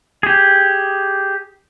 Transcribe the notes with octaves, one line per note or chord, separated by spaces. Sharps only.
G4 G#4